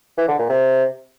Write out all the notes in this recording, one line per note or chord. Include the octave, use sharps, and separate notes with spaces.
E3
D3
A#2
C3